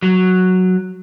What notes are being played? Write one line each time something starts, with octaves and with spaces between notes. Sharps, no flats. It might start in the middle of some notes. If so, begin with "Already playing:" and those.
F#3